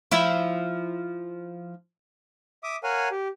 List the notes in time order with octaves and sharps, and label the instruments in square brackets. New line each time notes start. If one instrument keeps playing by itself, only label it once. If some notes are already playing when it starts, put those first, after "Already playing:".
[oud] F3 E4
[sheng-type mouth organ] E5 D6 D#6
A#4 C#5 F5 F#5 G#5
G4